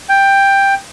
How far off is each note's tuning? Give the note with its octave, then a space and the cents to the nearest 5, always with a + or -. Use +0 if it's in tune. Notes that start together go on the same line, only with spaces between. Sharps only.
G5 +10